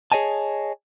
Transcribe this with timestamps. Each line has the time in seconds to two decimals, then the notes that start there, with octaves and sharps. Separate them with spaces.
0.12 G#4 C#5 D#5 G#5 A5